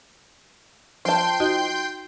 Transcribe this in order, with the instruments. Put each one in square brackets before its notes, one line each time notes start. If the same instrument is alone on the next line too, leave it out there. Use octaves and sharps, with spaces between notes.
[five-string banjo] F3 A5 [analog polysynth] G5 C6 G6
[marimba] D#4 F#4 D#5